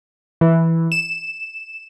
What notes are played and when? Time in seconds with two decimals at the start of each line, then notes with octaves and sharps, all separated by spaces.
0.41 E3
0.92 E7